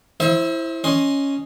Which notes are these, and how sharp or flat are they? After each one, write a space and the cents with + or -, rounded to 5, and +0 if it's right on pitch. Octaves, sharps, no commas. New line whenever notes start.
E4 +0 C5 +20 E5 -45
C#4 +0 D#5 +0 C6 +10